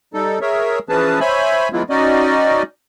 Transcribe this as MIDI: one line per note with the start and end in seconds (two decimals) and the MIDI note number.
0.14 0.39 55
0.14 0.39 63
0.14 0.39 69
0.41 0.79 68
0.41 0.79 70
0.41 0.79 73
0.41 0.79 76
0.89 1.20 52
0.89 1.20 53
0.89 1.20 61
0.89 1.20 68
0.89 1.20 71
0.89 1.20 81
1.20 1.69 72
1.20 1.69 73
1.20 1.69 76
1.20 1.69 80
1.20 1.69 83
1.72 1.83 52
1.72 1.83 54
1.72 1.83 56
1.72 1.83 59
1.72 1.83 64
1.72 1.83 65
1.90 2.63 61
1.90 2.63 63
1.90 2.63 66
1.90 2.63 74
1.90 2.63 75